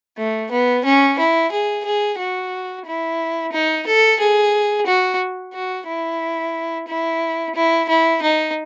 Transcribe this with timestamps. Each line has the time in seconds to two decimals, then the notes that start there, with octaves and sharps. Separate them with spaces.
0.18 A3
0.51 B3
0.85 C#4
1.19 E4
1.52 G#4
1.85 G#4
2.19 F#4
2.86 E4
3.52 D#4
3.86 A4
4.20 G#4
4.86 F#4
5.53 F#4
5.87 E4
6.88 E4
7.55 E4
7.88 E4
8.22 D#4